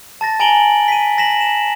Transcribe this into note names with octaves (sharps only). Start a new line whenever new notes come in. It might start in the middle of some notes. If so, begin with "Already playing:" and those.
A5 A6 A#6
G#5 A#5 D7 F#7 G7
B6 D#7
A#6 B6 E7 F#7
E7